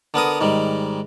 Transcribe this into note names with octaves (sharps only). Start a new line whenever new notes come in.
D3 B3 A#4 D#6
G#2 D#3 G3